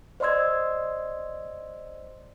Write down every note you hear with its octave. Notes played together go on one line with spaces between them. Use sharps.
C5 D5 D#5 C6 E6 G#6